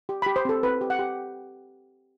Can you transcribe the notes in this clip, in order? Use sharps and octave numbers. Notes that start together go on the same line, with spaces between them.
G4
B5
G4
C5
C4 A4
C4 B4
G4
F#5
G4